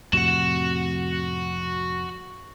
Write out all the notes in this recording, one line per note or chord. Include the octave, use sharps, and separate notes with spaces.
F2 A2 C3 F#4 F#5 E7